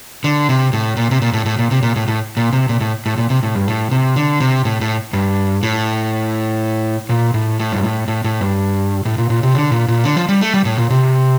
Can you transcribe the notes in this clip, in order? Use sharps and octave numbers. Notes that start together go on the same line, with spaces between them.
D3
C3
A2
A#2
C3
A#2
A2
A2
A#2
C3
A#2
A2
A2
A#2
C3
A#2
A2
A2
A#2
C3
A2
G2
A2
C3
D3
C3
A2
A2
G2
A2
A#2
A2
A2
G2
A2
A2
A2
G2
A2
A#2
A#2
C3
D3
A#2
A#2
D3
F3
G3
A3
G3
A2
A#2
C3